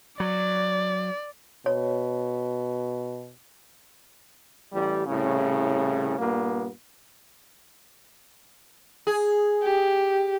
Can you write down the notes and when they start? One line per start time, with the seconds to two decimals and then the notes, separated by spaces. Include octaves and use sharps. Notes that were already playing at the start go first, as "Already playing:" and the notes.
0.20 F#3 D5
1.66 B2 C#5
4.73 A1 G3
5.06 C2 A2 C#3
6.18 G2 A#2 A#3 B3
9.07 G#4
9.63 G4